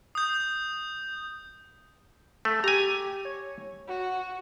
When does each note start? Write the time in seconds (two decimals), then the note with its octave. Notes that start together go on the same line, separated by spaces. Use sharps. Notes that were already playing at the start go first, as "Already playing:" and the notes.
0.15 D#6 G6
2.45 A3
2.64 G4 G#5 A#5
3.25 C#5
3.88 F#4